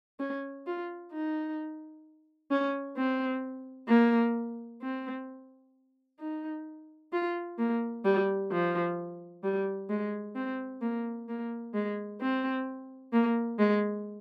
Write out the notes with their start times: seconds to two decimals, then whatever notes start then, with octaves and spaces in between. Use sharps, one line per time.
0.20 C#4
0.67 F4
1.12 D#4
2.51 C#4
2.97 C4
3.89 A#3
4.82 C4
6.20 D#4
7.13 F4
7.58 A#3
8.05 G3
8.51 F3
9.43 G3
9.90 G#3
10.36 C4
10.81 A#3
11.29 A#3
11.74 G#3
12.21 C4
13.13 A#3
13.59 G#3